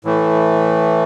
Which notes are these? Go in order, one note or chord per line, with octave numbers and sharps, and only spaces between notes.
A2 E3 A3